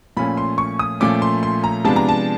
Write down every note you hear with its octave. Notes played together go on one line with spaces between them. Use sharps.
A#2 F3 A3 C#4 B5
C6
C#6
D#6
A#2 F3 A3 C#4 D6
C6
C6
A#5
C3 F3 G#3 B3 D4 A5
A#5
A5